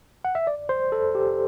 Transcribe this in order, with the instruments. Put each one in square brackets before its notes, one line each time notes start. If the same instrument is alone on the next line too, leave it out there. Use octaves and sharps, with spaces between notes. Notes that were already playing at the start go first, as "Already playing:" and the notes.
[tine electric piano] F#5
E5
D5
C5
A4
G4